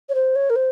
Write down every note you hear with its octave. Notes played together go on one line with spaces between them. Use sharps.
C#5
C5
C#5
A#4
C5